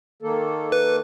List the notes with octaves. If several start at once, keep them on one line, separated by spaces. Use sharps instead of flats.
D#3 A#3 A4
B4